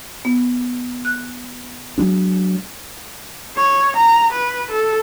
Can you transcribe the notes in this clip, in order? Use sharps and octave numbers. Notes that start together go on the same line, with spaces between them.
B3
F#6
F#3 G#3 D4
C#5
A#5
B4
A4